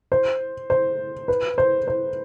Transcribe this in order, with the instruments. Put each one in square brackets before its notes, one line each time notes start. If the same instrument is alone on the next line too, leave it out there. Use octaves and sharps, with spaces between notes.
[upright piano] C5
C5
B4
C5
C5